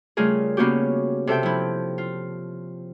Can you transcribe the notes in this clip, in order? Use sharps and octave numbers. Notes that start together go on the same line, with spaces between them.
C#3 G3 A3 F4 G#4 A#4
C#3 A#3 B3 C#4 F#4 G4
C3 A4 E5 G5
F3 E4
F4